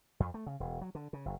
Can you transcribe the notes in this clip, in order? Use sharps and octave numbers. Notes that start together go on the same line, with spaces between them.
F2
A3
C#3
E1
F#3
D3
C#3
F#1